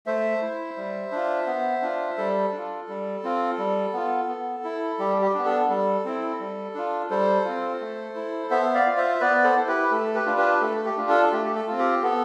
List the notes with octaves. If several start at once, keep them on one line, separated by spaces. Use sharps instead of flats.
A3 C5 E5
E4
G3
D4 F4
B3
D4 F4
G3 A4
D4
F4
G3
C4 F4
G3
B3 F4
B3
E4
G3 G4
G4
B3 D4
A4
G3 A4
C4 E4
G3
D4 F4
G3 A4 C5
C4 F4
A3
E4
B3 C5 E5
D5 F5
F4
C5 E5
B3 B4 D5
A4 C5
E4
G4 B4
A3 A4
G4 B4
D4 F4
G4 B4
A3 A4
G4
D4 F4
A4
A3 G4
G4
A4
C4 F4
G4
B3 A4